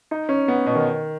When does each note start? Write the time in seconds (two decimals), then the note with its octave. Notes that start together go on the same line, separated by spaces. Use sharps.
0.11 D#4
0.29 C#4
0.48 B3
0.66 B2
0.75 D#3